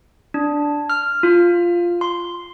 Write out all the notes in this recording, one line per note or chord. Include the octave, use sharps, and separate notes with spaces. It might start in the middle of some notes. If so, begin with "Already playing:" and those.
D4
F6
F4
C6